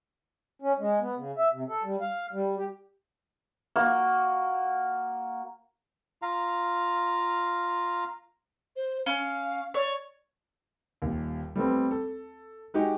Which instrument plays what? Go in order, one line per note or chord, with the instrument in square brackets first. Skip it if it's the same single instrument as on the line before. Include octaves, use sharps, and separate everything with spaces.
[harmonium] C#4
G#3
B3
C#3
E5
C3
A4
G3
F5
G3
G4
[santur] A#3 [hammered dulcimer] F#4
[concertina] F4 F5 A#5
[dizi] C5
[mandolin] C#4 [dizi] F5
[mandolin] C#5 [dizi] D5
[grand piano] D#1 D#2
G3 A3 B3 C4
A4
G#3 D#4 F#4 G4